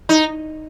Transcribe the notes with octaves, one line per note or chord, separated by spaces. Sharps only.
D#4